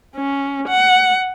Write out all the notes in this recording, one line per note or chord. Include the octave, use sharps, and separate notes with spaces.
C#4
F#5